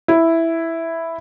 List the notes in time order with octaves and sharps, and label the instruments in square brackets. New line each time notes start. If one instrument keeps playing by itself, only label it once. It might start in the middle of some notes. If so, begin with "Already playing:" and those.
[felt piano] E4